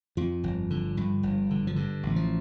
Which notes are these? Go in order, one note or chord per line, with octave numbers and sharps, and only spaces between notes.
F2 F3
G1
D3
G2
G1
D3
F3
G2 D3
A1
F3